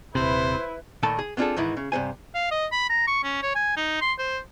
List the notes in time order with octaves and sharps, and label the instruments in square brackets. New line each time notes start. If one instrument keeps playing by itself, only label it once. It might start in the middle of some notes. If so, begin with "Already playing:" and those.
[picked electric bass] D#1 G#1 C3 [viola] E4 B4 [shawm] C5
[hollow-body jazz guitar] A#2 D#3 A3 A4 A5 B5
G#4
B3 C4 D4 F4 G#4 A4
G#2 D#3 E3 E4
C#3
G2 C3 C5 G#5
[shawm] F5
D#5
B5
A#5
C#6
C#4
C#5
G#5
D#4
C6
C5